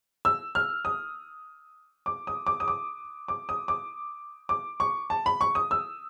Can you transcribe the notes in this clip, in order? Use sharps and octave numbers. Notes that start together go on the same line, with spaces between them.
E6
F6
D#6
D6
D#6
D6
D#6
D6
D6
D#6
D6
D6
C#6
A5
B5
C#6
D#6
E6